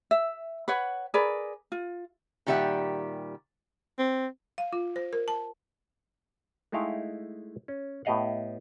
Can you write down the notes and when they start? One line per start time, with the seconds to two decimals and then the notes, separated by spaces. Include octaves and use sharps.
0.11 E5
0.68 B4 C#5 F#5
1.14 G#4 A#4 B4 D5
1.72 F4
2.46 A#2 D#3 G3 G4 E5 F#5
3.99 C4
4.58 F5
4.73 F4
4.96 C5
5.13 A#4
5.28 A5
6.72 G#3 A3 D#4 E4 F5 G5
7.68 C#4
8.05 A2 B3 G4 D#5 F5 F#5